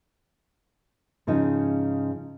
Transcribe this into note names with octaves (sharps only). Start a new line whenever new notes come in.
G#2 C#3 F3 D#4